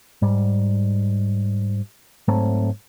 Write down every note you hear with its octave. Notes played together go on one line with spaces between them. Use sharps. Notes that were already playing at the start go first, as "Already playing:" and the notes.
G#2 G3
G#2 F#3 A3 C4